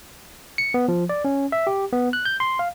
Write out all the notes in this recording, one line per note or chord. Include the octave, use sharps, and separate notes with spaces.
C#7
B3
F3
D5
C#4
E5
G4
B3
F#6
G6
C6
F5